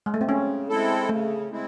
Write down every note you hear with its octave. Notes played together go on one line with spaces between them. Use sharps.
G#3
A3
C4
C#3 C#4
G#3 C4 E4 A4
C#3 A3
G#3 C4 E4